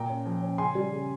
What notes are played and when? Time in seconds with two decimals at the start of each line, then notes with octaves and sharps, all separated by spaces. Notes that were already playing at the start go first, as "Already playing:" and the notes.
Already playing: A#2 G5 A#5
0.10 C#4
0.26 F3
0.42 C#4
0.58 C#3 G#5 C6
0.75 G3
0.92 C#3